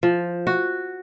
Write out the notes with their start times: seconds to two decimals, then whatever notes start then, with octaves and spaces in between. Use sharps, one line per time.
0.03 F3
0.47 F#4